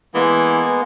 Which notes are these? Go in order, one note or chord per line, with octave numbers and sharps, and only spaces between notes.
E3 G#3 A#3 B3